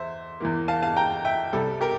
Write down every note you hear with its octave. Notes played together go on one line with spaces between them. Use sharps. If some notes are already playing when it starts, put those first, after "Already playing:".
Already playing: E2 C5 E5
E2 E3 A#3
F5 A5
F5 A5
G5 A#5
E5 G5
C2 C3 G3 A4
G4 A#4